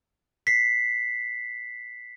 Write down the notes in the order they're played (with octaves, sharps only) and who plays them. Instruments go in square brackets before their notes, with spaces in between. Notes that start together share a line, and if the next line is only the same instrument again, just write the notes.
[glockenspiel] B6 C7